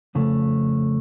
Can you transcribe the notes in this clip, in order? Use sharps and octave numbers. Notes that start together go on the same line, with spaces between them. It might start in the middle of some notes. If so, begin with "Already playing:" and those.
F2 C#3 F3 A3